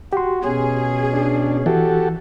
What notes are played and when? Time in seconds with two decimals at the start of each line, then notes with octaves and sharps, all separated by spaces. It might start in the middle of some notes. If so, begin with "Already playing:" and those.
0.13 F#4 G4 C6
0.44 B2 C#4 G#4
1.13 D4
1.66 E3 F#4 G4 A4